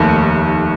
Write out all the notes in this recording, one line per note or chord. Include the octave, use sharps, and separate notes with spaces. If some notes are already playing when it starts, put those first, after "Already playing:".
Already playing: F1 D#2 D#3 A3